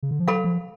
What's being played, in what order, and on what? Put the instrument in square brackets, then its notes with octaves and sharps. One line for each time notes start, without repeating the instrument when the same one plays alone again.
[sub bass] C#3
D3
F3
[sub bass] F#3 [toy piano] A4 F5 B5
[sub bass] F3